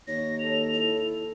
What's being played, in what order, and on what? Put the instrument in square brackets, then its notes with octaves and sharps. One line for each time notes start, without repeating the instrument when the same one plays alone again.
[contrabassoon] D#2 [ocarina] C#5 [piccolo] A#6
[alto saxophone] A4 [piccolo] F7
[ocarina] E4